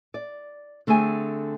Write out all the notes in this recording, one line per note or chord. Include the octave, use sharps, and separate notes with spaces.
D5
D3 A3 C4 G#4 G#5